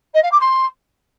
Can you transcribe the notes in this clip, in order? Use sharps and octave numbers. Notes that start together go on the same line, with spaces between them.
D#5
F5
D6
C6